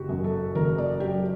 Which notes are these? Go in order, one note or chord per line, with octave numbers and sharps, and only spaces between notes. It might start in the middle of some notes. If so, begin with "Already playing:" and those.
Already playing: F#1 F#4 G4
F#2
A4
F#1 A#4
D5
F#3 G4